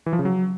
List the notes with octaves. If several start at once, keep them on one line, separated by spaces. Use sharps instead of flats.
E3
F3
C#3
F#3